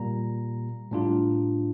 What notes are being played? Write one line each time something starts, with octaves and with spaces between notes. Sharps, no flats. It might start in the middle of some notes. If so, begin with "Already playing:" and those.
Already playing: A#2 G3 A#3 A#5
A2 G3 D4 F4